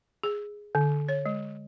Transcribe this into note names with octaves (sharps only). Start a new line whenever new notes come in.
G#4
D3
C#5
G#3